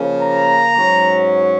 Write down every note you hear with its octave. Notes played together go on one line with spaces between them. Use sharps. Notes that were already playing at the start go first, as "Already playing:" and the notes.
Already playing: C#3 F3 A#3 C#4
A#5
G#2 F#3 C#4